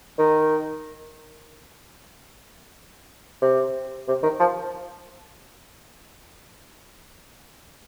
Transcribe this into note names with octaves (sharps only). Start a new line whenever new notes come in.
D#3
C3
C3
D#3
F3